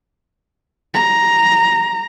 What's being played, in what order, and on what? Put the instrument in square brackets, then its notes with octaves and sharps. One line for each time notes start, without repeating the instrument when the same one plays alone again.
[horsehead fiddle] A#5